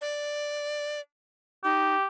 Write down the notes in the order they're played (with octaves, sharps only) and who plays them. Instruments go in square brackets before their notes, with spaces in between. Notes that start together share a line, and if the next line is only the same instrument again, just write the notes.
[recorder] D5
[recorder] D#4 [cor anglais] G4